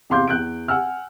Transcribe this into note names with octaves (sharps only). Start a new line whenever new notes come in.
E2 C3 F5 C6 D6 G6
E2 F#6 G6 D7
F#5 G#5 E6 F6